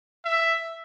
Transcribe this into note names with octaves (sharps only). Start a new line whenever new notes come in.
E5